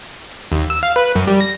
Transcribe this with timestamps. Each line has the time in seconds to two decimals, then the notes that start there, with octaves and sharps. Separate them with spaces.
0.52 D#2
0.70 E6
0.83 F5
0.96 B4
1.15 F#2
1.27 G3
1.41 A#6